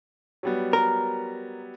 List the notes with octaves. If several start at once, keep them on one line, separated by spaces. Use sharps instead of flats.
F#3 G3 B3
A#4